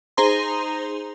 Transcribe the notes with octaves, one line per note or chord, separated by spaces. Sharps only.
D#4 G#4 C5 A#5 C6